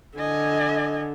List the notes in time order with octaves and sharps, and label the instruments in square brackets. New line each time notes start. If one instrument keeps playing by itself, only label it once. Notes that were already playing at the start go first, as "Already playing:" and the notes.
[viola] D3 [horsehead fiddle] D#5 G#5